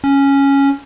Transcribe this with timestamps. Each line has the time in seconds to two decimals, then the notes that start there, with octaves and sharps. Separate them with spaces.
0.04 C#4